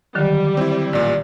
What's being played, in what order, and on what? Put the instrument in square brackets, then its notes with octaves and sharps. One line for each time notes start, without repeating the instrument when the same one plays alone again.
[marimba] D3 D#3 F#3 [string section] G3
[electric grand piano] C4 E4
[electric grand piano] A1 A#2 [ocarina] D5